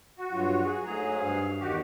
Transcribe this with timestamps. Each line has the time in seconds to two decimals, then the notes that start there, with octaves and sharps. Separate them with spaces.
0.18 F#4
0.32 G2 F#3 F4
0.64 G#4
0.85 G#2 F#3 A3 G#4 A#5
1.16 G2 F5
1.60 E2 D#3 F#4 G4